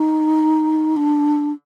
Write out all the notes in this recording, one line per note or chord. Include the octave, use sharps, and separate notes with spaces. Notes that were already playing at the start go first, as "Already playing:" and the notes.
Already playing: D#4
D4